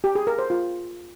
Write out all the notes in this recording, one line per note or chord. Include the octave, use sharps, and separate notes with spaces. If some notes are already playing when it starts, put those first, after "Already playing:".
G4
G#4
A#4
C5
F4